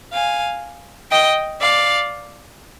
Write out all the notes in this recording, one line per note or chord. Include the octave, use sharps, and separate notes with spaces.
F5 G#5
D#5 G5
D5 F5